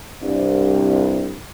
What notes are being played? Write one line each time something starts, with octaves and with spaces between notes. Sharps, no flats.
C2 G2